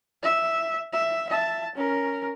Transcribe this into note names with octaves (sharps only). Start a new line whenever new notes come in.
E5
E5
E5 A5
C#4 A#4